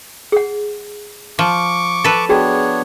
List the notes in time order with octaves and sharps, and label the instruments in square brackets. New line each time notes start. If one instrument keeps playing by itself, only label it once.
[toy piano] G#4 F#5
[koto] F3 [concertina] C#6 D6
[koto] A4 B4
[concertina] B3 D4 C#5 [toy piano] F#4 G#4 G5